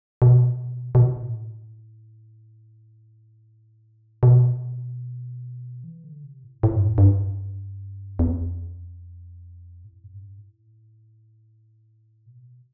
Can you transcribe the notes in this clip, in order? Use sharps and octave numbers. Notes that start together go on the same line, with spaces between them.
B2
B2
A2
B2
E3
D3
C3
A2
A2
G2
F2
G2
E2
F2
A2
F2
G2
A2
B2